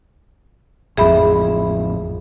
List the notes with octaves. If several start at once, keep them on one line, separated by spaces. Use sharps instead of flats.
A1 F2 G#4 E5 B5